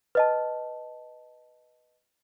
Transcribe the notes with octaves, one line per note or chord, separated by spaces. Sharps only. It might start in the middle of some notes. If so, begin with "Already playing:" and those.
B4 D#5 A5